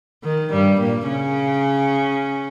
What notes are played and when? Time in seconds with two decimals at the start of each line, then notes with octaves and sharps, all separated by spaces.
0.24 D#3
0.52 G2 G3
0.80 A#2 A#3
1.08 C#3 C#4